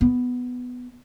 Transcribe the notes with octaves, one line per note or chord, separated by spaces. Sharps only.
B3